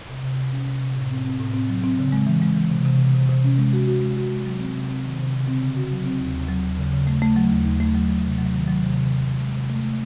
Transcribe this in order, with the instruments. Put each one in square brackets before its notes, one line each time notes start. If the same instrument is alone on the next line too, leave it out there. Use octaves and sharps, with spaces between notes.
[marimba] C3
C3
C3
C#4
C3
C3
A2
C4
C4
A2
C4
F#3
C4
C#3
G#3
E3
G#3
E3
C3
C3
C3
C3
C3
C#4
G#3
F#4
F#4
G#3
F#4
G#3
F#3
C4
C3
C4
D#3
C3
C#3
C4
C#3
F#4
F#3
C4
D#2
D#2
F#3
D#2
C#3
C#3
A3
A3
F#3
D#2
D#2
A3
F#3
F#3
C3
F#3
D#3
F#3
C3
C3
C3
C3
G#3
C3
A3
A3